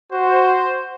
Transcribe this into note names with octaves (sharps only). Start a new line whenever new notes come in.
F#4 C5